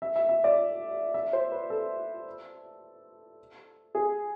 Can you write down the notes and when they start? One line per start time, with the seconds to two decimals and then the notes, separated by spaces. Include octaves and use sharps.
0.02 E5
0.16 E5
0.29 E5
0.44 D5
1.14 E5
1.33 C5
1.52 B4
1.70 A4
3.95 G#4